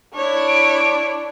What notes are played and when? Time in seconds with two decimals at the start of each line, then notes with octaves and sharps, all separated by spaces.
0.15 D4 E4 C#5
0.48 D7